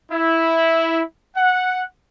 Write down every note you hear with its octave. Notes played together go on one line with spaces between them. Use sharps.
E4
F#5